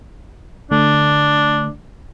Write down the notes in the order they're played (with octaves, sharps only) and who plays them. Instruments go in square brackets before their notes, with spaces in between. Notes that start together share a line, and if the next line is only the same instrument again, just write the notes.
[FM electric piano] D3 A3 [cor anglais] D4